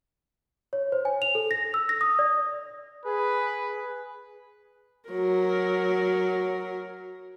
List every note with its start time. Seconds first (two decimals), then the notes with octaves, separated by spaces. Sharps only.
0.73 C#5
0.92 C5
1.05 G#5
1.22 F7
1.35 A4
1.51 A#6
1.74 E6
1.89 A#6
2.01 D#6
2.19 D5
3.05 G#4 B4
5.10 F#3 A#4